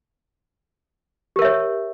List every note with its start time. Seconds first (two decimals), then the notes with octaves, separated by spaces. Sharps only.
1.36 G4
1.39 A#4
1.42 E5
1.45 C#5